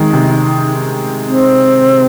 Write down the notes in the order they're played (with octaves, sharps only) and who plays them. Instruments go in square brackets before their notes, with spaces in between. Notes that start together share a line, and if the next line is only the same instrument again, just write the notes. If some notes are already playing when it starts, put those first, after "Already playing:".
Already playing: [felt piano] D#3 G#3 [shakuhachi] D#4
[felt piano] C3
[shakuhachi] C4